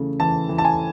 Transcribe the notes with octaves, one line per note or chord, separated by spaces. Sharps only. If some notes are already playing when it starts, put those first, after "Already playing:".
Already playing: C#3 E3 A3
E3 A5
E3
A5
G#5